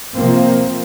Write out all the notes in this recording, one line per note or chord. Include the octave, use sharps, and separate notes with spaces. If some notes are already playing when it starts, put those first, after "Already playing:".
C3 F3 A#3 C4